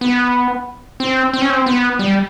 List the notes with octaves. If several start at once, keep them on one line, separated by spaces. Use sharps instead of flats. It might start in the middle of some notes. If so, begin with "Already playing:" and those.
B3
C4
C4
C#4
C4
B3
G3